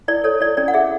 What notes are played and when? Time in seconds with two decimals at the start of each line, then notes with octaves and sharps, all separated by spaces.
0.08 E4 D5
0.24 A4 C#5
0.41 E4 D5
0.57 C#4 D5
0.68 F#5
0.74 G#4 E5